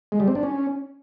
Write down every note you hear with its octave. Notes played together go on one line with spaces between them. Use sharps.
G#3
G3
C4
D4
C#4